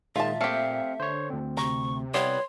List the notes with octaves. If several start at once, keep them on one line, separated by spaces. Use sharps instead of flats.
A#2 D#3 G#3 F4 E5 A5
A3 C4 G4 F5 C#7
D3 C5 C#5
D2 C4
C3 A#5 C#6
G3 B3 E4 C#5 C6